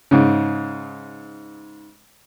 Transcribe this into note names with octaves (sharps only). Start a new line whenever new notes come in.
G#2 C#3